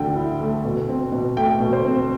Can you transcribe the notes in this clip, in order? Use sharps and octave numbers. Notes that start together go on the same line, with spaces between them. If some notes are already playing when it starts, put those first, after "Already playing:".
Already playing: D2 D3 G5
E4
A3
B2
C4
B2
A3 G5
B2
C5
C4